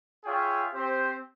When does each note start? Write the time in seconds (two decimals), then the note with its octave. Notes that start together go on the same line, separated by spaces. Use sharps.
0.25 F4 G#4 C#5 E5 G5
0.73 C4 G4 C5